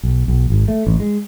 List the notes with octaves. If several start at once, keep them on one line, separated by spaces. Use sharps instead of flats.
B1
B1
G#1
A3
A1
G#3